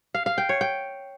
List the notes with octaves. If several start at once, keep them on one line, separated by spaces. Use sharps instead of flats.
F5
F5
G5
C#5
G5